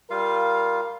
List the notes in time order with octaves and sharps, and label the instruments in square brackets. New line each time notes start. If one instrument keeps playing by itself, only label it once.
[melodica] G3 F4 F5 [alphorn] A#4